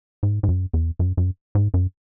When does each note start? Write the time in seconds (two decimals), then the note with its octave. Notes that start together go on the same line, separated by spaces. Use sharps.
0.23 G#2
0.43 G#2
0.49 F#2
0.74 E2
0.99 F#2
1.17 F#2
1.55 G#2
1.74 F#2